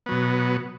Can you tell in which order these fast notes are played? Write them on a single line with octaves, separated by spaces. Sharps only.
B3 F#3 B2